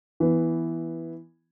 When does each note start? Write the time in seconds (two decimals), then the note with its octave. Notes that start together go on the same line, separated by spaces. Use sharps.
0.20 E3 B3